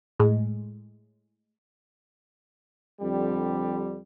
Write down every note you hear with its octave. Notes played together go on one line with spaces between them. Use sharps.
A2 G#3
F2 D3 G3